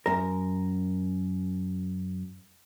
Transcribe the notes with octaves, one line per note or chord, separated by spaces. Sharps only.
F#2 A#4